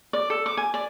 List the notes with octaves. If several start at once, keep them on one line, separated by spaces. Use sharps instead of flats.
D5
A4
D6
G#5
D5